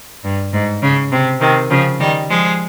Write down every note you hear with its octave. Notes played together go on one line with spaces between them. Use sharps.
G2
G#2
C#3
C3
C3 D#3
C#3 F3
D#3 G3
F3 G#3